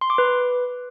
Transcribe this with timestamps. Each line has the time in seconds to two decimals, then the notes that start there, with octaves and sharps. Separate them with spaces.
0.01 C6
0.10 D6
0.18 B4